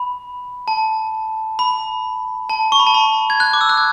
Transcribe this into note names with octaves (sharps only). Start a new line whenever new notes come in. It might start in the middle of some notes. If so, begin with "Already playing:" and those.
Already playing: B5
A5
B5
A5
C#6
B5
A5
B5
G#6
F#6
D6
E6
F#6
G#6